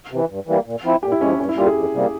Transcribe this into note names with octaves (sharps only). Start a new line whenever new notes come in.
C3 E3
G2
E3 G3 A#3
A#2
F3 C4 E4
A#2 G4
E4
F3 G#3 C#4
E4
G2 C#4
E4
G3 A#3 F4 G4
G#4
F2
C3 G3 A#3